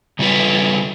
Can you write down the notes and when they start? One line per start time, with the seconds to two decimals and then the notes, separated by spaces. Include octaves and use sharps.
0.19 C#3 G3 F4 B4